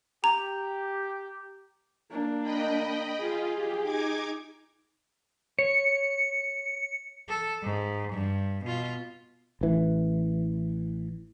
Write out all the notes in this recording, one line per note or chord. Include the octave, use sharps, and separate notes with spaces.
G4 A#5
A#3 D4
D#5 G5 B5
F4 G#4
G4
D#4 D6 G#6
C#5 C#7
A4
G#2
G2
B2 F4
A1 E3